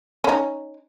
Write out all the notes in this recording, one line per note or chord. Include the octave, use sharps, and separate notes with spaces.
C#4 D#4